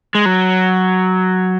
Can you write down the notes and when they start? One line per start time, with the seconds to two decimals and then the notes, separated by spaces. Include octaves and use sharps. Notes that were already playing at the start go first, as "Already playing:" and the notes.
0.15 G#3
0.26 F#3